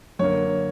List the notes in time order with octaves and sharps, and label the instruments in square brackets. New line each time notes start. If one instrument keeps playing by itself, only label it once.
[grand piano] F#2 D3 A#3 C#5